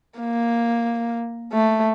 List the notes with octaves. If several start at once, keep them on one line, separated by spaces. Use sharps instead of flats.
A#3
A3